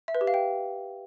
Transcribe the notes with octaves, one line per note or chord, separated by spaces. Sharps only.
E5
B4
G4
F5
G5